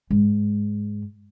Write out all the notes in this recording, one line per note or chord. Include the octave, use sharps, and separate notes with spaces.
G#2